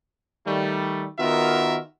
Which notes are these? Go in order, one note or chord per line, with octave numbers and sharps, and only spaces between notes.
D#3 G3 A3
D#3 B3 F4 F#4 A#4 E5